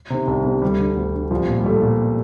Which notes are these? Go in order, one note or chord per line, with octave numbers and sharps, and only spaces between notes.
C3 D#3
C2
C3 D#3
D2 G3
D3
D2
D3
C2 F3
A#2
G3
C2 A3
A#2